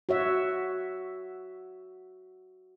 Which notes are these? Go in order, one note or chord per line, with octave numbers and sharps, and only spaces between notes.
F#4 C#5 E5